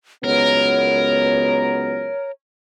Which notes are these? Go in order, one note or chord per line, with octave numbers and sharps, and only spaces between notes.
C#2 F#3 B3 A#4 C#5